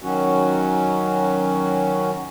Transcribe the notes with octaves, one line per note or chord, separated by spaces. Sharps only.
D#3 F#3 C#4 F#4